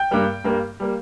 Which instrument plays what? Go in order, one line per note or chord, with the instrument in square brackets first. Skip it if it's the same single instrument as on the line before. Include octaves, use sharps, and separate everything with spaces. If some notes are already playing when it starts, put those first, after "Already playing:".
Already playing: [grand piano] G5 G6
G2 G3 A#3
G2 G3 A#3
G3 A#3